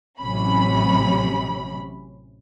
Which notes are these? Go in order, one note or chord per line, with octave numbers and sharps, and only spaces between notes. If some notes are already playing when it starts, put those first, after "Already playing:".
A1 C3 F#3 C#4 B5